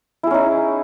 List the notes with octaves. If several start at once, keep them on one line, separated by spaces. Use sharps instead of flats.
C#4 D#4 E4 G#4